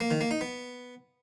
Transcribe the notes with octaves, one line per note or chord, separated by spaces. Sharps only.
A#3
D#3
A#3
D#4
B3